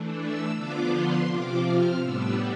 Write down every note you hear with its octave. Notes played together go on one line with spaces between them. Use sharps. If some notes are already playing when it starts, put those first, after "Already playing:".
Already playing: E3 A3 D4
E6
D3 F3 B3 D4 F4 D6
C6
C3 F3 C4 F4 D6
F6
A2 G3 B3 D4 E6